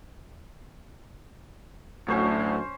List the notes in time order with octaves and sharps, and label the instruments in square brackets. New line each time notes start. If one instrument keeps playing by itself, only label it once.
[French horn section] D2 F#3 [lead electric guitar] A2 [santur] C#4 C5 C#6